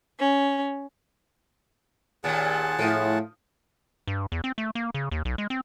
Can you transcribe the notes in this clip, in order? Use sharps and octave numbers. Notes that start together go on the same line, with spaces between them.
C#4
D#2 A#2 G#4 F#5 A5
A2 F3
G2
E2
C4
A3
A#3
C#3
D#2
B1
G#3
C4